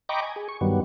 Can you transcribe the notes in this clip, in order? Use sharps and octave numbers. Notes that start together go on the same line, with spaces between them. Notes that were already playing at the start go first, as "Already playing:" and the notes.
D#5 G5 A#5 B5 C#6 D6
G#5
G#4
C#6
G2 D#3 F#3 G3 B3